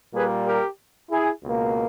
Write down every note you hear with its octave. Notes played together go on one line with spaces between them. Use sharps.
A#2 G3 A#3 G#4 B4
G4 A#4
E4 G#4
C#2 B2 A#3